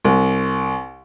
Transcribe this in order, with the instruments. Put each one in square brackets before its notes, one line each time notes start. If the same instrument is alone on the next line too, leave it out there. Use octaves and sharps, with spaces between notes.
[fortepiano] C2